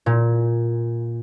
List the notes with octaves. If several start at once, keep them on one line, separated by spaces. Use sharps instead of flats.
A#2